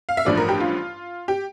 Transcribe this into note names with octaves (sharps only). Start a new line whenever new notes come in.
F5
E5
A1 G2 F3 A3 D5
A#4
G4
F4
G4